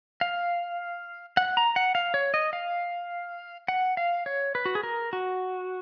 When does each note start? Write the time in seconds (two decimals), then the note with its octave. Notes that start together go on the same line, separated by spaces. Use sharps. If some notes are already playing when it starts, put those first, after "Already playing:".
0.21 F5
1.37 F#5
1.57 A#5
1.76 F#5
1.95 F5
2.14 C#5
2.34 D#5
2.53 F5
3.68 F#5
3.97 F5
4.26 C#5
4.55 B4
4.65 F#4
4.75 G#4
4.83 A#4
5.13 F#4